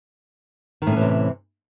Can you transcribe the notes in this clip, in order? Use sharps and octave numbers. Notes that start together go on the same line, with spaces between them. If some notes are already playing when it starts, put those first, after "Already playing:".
A2 C3 D#3 E3 C#4